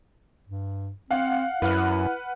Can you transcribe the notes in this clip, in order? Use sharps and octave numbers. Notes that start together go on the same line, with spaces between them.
G2
C4 F5 F#5
F#2 E4 B4 F#5 F6